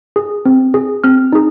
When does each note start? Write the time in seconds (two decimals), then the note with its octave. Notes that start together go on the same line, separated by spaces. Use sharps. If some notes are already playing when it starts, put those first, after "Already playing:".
0.16 G#4
0.45 C4
0.74 G#4
1.04 C4 F6
1.32 D#4 G#4